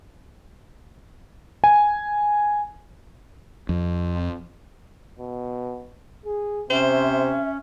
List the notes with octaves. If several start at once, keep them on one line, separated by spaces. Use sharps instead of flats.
G#5
F2
B2
G#4
C3 C#4 C5 E5